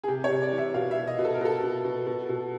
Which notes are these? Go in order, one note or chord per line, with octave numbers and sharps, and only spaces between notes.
G#4
C3 G4
C#5
C3
D5
E3
E5
B2 F5
E5
B2
D#5
B2
A4
A#4
B2 A4
B2
B2
B2
B2